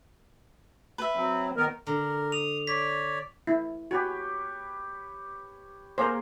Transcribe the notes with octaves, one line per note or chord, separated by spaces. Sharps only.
B4 E5
F#3 C4
D#3 B3 A#4
D3 A#4
D#6 F7
C#5 D5 B6
E4
F#4 G4 B4 C#5
A#3 G#4 A#4 C5